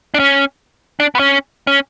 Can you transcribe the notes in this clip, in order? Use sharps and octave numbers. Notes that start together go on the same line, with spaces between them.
D4
C#4
D4
B3
C#4
C#4